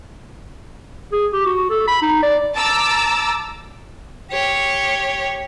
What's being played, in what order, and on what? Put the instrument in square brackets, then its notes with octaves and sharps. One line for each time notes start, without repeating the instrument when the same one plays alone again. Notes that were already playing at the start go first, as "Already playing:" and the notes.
[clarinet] G#4
G4
F#4
A4
B5
D#4
D5
[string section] A5 A#5 D6 E6 A6
[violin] G4 C#5